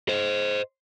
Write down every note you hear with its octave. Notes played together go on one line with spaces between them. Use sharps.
C5 D#5